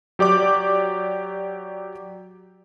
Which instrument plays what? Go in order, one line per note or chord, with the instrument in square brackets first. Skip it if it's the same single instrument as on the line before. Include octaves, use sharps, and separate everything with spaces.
[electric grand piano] F#3 G4 D5 D6